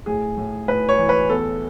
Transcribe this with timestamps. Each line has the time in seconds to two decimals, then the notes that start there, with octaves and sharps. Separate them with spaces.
0.06 A2 G#4
0.37 A2
0.68 A2 B4
0.89 C#5
0.98 E3
1.09 B4
1.29 E2 A4